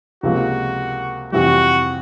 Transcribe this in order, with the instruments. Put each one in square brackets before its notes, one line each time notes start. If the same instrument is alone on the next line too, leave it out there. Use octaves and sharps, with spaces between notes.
[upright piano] C#2 C3 F3 A#3 [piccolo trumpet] F#4
[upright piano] F2 C3 E3 G3 [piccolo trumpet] F#4